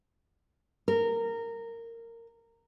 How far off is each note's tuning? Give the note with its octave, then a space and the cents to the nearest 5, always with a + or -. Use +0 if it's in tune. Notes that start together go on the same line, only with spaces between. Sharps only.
A#4 -15